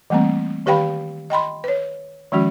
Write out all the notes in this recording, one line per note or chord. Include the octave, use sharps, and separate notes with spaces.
E3 G3 A3 A#3 C4
D#3 G4 B4 F5 G5 B5
D#5 G5 B5 C6
B4 C#5
D#3 F3 G#3 C#4 F#4